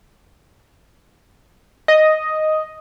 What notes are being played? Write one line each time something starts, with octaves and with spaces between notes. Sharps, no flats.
D#5